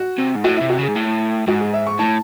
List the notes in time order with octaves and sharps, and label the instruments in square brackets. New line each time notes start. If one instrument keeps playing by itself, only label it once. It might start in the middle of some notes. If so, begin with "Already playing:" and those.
Already playing: [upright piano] F#4
[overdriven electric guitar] C3
G#2
[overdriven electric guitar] A2 [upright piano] F#4
[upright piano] E4
[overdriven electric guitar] C3
[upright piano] F#4
[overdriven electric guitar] C#3 [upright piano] G#4
[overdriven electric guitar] G#2
A2
[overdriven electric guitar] G#2 [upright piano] F#4
[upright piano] G#4
E5
C#6
[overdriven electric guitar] A2 [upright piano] A5